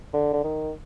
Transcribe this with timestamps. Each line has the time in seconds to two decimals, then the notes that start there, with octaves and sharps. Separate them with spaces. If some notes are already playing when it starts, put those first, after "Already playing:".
0.13 D3
0.33 D3
0.44 D#3